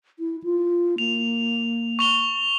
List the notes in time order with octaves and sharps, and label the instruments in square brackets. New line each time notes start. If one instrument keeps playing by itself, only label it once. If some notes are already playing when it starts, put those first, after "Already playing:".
[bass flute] E4
F4
[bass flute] A#3 [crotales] F7
[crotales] C#6 F7 G7